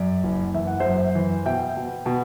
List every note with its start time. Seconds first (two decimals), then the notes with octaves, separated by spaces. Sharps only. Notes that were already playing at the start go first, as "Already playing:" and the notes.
Already playing: F#2 D5
0.24 F#1
0.54 E3 E5
0.67 F#5
0.80 C5 E5
0.85 F#2
1.15 E3
1.46 B2 E5 G5
1.77 B2
2.06 B2